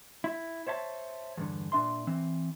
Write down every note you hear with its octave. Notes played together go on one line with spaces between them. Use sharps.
E4
C5 C#5 E5 F5 A5
E2 G2 D3
A#2 D4 E5 C6
E3 C4